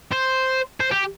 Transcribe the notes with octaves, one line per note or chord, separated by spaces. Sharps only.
C5
C5
G4